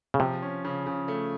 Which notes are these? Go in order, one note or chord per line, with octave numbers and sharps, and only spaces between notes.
C#3
C3 F3
C#4
C#3
C#3
A3